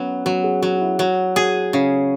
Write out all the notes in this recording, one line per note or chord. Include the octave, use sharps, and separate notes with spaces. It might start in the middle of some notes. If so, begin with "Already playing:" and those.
Already playing: F#3 B3 C#4
F#3 F#4
G#4
F#3 F#4
F#4
E4
F#3 F#4
F#4 G#4
C#3 C#4